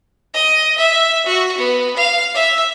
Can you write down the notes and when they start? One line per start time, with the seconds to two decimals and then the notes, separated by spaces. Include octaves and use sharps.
0.34 D#5
0.78 E5
1.26 F#4
1.58 B3
1.96 F5
2.34 E5